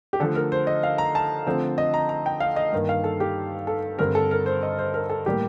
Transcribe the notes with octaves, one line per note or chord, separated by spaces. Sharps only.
G4
D3 F3 A3 A4
A#4
C5
D#5
F5
A#5
A5
D3 F3 A3 C4
D#5
A#5
A#5
G5
F5
D#5
G2 D#3 A#3
F5
A4
G4
A4
G2 D3 G3 C4 A#4
A4
A#4
C5
D#5
C5
A#4
A4
A2 G3 A#3 G4